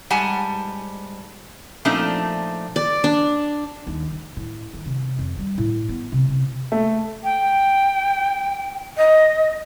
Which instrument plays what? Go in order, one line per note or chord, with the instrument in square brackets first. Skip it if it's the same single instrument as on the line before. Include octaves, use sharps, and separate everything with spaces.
[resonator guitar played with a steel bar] G#2 G3 F#5 G#5 A5
A#2 F3 A3 C4 D4 D#4
[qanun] D5
D4
[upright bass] D#2
D3
A2
D#3
C3
F2
G3
A2
B3
C3
C3
[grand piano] A3
[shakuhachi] G5
D#5